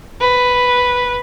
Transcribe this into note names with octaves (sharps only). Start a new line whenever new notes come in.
B4